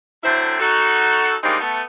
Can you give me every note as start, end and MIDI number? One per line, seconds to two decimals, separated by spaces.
0.24 0.55 50
0.24 0.55 54
0.24 0.55 57
0.24 0.55 60
0.24 0.55 64
0.24 0.55 72
0.60 1.35 63
0.60 1.35 66
0.60 1.35 69
1.43 1.60 55
1.43 1.60 56
1.43 1.60 58
1.43 1.60 60
1.43 1.60 62
1.43 1.60 63
1.60 1.82 57
1.60 1.82 59